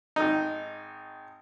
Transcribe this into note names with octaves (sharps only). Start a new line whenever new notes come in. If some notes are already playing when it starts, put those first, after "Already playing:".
G#1 D#4